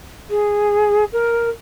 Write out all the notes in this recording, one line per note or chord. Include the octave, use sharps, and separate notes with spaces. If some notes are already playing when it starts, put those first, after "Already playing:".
G#4
A#4